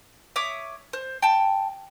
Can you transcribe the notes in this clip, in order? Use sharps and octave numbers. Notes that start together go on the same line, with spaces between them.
C#5 E5 D6 D#6
C5
G5 A5